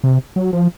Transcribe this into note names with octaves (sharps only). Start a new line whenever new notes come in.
C3
F#3
F3